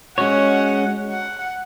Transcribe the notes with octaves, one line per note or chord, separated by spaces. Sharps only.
G#3 C#4 F#4 C#5 F#5
F#5